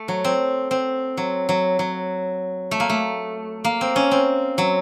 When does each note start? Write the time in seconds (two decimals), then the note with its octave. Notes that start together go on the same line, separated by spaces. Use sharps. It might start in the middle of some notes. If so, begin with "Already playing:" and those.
Already playing: A3
0.08 F#3
0.24 C4
0.71 C4
1.17 F#3
1.49 F#3
1.79 F#3
2.71 A3
2.80 A#3
2.89 A3
3.64 A#3
3.81 C4
3.96 C#4
4.11 C4
4.58 F#3